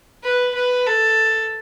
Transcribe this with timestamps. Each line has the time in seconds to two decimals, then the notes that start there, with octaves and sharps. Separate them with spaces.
0.23 B4
0.55 B4
0.86 A4